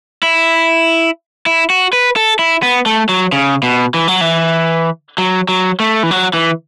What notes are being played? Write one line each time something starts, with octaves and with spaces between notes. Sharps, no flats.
E4
E4
F#4
B4
A4
E4
B3
A3
F#3
C#3
B2
E3
F#3
E3
F#3
F#3
A3
E3
F#3
E3